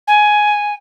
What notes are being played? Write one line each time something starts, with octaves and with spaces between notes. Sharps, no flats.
G#5